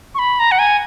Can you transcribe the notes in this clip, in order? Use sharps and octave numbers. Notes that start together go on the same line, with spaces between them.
C#6
B5
A#5
F#5
G#5